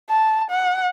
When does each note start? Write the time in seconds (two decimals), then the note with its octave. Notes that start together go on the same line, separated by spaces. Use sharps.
0.10 A5
0.51 F#5